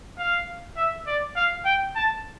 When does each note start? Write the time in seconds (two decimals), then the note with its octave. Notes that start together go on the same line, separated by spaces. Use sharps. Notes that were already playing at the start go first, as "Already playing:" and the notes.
0.18 F5
0.77 E5
1.07 D5
1.36 F5
1.65 G5
1.95 A5